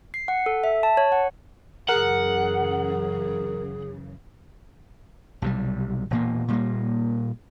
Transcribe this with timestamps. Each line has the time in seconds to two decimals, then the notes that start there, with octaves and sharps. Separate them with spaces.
0.14 C7
0.28 F#5
0.46 A4
0.64 E5
0.83 A5
0.97 C#5
1.12 F#5
1.89 F#2 C#3 E3 G#4 A#4 F#5
5.42 B1 C3 F#3 G3
6.10 E1 A#2 A#3
6.48 A#2 G3 A#3